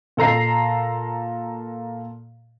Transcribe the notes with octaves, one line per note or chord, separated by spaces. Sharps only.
A#2 A4 A#5 C7